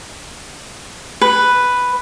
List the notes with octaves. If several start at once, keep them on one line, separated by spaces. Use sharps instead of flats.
B4